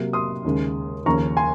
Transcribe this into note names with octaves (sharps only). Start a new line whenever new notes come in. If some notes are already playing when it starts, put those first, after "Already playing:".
Already playing: C3 F#3 A#3
C6 D#6
D#2 C#3 G#3
D#2 C#3 F3 A#3 C#4 A#5 C#6
G#5 C6